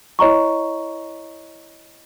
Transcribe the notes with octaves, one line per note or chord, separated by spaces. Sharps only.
E4 C#5 D#5 A#5 C#6